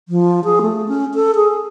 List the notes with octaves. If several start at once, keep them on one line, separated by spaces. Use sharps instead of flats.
F3
G#4
A3
C#4
A4
G#4